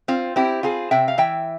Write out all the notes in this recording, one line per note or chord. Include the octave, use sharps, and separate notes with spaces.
C4 F4
C4 E4 G4
C4 F4 G#4
C3 E5 G5
F5
E3 E5 G5